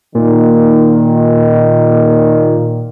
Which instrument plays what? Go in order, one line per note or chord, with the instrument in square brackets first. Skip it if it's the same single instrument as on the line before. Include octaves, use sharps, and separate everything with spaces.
[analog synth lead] A#2 [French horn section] D#3